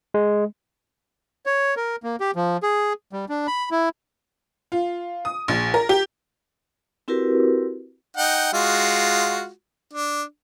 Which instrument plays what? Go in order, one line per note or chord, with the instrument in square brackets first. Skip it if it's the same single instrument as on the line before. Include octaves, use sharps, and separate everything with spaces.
[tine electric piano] G#3
[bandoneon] C#5
A#4
A#3
G4
F3
G#4
G3
D4
B5
E4
[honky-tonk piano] F4
D#6
A#1
A#4
G4
[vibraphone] C4 E4 F#4 G4 A#4 B4
[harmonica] D#4 F#5 G5
G#3 F4 F#4
D4